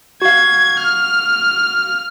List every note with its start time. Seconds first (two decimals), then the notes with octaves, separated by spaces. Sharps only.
0.22 F#4 F5 G#6
0.80 F6